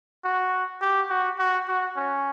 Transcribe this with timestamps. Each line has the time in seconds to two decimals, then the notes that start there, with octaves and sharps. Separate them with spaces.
0.25 F#4
0.82 G4
1.10 F#4
1.39 F#4
1.68 F#4
1.96 C#4